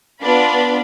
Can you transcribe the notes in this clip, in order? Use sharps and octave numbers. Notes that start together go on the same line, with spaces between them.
B3 D4 F4 D5 B5